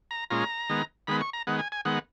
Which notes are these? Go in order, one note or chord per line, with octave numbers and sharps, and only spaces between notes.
A#5
A#2 G#3 C#4 F4 A#5
D#3 G#3 B3
D#3 G#3 B3 B5
C#6
A#5
D#3 G#3 B3 F#5
G#5
G#5
D#3 G#3 B3 F#5